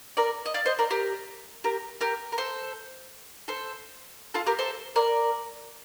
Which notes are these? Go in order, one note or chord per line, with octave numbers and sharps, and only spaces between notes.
A#4 D5
D#5
D5 F5
C5 D#5
A#4 D5
G4 A#4
G4 A#4
G4 A#4
A#4
A4 C5
A4 C5
F4 A4
G4 A#4
A4 C5
A#4 D5